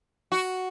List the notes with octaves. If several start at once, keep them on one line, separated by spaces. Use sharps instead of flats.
F#4